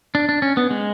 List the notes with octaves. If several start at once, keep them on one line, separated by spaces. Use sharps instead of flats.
D4
D4
C#4
B3
G#3